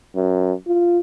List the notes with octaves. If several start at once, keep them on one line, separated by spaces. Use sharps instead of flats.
F#2
F4